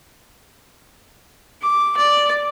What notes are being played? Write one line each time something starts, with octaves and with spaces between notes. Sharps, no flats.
D6
D5